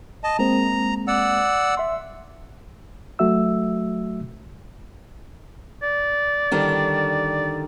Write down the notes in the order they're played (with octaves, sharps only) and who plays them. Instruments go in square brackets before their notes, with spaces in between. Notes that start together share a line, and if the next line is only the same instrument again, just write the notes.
[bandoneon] D#5 A5
[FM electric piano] G#3 A#3 C4 [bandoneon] A#5
[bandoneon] D5 F#5 E6
[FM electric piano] E5 C6
[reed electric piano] F#3 A3 F#4 E5 E6
[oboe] D5
[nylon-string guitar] D3 D#3 G3